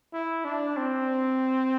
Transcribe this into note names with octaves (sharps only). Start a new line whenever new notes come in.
E4
D4
C4